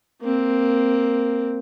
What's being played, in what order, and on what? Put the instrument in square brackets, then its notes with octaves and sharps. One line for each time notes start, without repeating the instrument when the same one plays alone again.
[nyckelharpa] A#3 C4